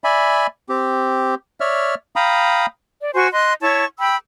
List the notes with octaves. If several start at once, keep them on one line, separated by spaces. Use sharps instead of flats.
D5 E5 G#5 B5
C4 G4
C#5 D5 E5 F6
F5 G5 A#5 B5 D#6
D5
F#4 C5 G#5 C#6
D#5 C6 F#6
E4 C#5 A5 C#6
G5 B5 E6